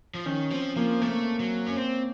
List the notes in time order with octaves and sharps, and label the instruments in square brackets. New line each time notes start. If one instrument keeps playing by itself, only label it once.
[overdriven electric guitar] F3
[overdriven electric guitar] D#3 [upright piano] C#4
[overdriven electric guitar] F3 [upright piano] C4
[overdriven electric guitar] F3 [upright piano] A#3
[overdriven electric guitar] A3 [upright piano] A#3
[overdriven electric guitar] F#3
C#4
C4